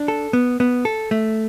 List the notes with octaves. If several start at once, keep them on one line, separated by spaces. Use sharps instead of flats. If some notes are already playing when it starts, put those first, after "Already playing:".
Already playing: D4
A4
B3
B3
A4
A3